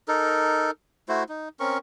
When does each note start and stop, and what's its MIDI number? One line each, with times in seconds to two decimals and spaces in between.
0.08 0.71 63
0.08 0.71 69
0.08 0.71 70
1.09 1.24 57
1.09 1.24 64
1.09 1.24 66
1.09 1.24 72
1.29 1.49 63
1.60 1.78 60
1.60 1.78 61
1.60 1.78 70
1.60 1.78 85